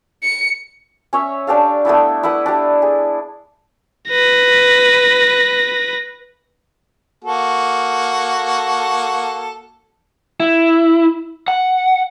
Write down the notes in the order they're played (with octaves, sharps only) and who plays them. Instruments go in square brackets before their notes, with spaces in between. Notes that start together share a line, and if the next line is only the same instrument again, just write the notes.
[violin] C#7
[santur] C#4 C#5 E5
D4 G4 A4 F5
A3 B3 D4 E4
E4 A4 B4 F#5
D4 G4
G#4
[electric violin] B4 A#6
[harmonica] A#3 F#4 A4
[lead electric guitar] E4
F#5